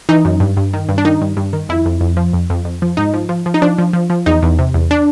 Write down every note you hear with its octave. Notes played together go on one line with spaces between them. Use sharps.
E3 D#4
F#2
G2
G2
D#3
G2
D4
D#3 D#4
G2
G2
D#3
F2 E4
F2
F2
F3
F2
F2
F2
F3
G#2 D#4
F3
F3
F3
D#4
F3 D4
F3
F3
F3
E2 D#4
E2
C3
E2
D4